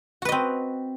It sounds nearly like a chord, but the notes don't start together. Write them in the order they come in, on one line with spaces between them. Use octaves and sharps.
F#4 B4 D#5 C4